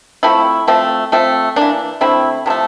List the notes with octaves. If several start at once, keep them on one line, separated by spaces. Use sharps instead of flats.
F3 A3 C4 E4
F3 A3 C4
F3 A3 C4
E3 A#3 D4
D3 A3 C4 E4
C3 F3 A3